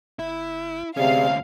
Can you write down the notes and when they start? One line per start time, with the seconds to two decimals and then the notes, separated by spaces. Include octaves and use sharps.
0.19 G1 E4
0.97 D2 C3 C#4 G#4 D5 F5